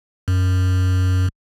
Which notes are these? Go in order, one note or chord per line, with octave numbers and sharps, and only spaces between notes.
F#2